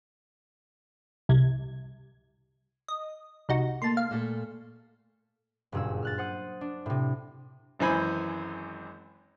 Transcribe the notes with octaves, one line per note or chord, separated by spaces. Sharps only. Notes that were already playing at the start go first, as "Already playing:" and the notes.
C2 G#6
D#5
C2 D#4 F#4
A3 A#3 A5 C6
F5
A#2 A3 A4
F#1 G2 A#2 G#4 E6
F6 F#6 A6
C5 F#5 D#6
D4
A2 C3
G#1 F#2 E3 C5 G#5 B5